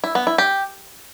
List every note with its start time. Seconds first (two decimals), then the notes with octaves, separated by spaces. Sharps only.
0.04 E4
0.15 B3
0.27 E4
0.38 G4